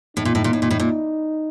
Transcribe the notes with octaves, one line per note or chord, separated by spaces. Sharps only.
A2 D#4
A#2
A2
A#2
A2
A#2
A2
A#2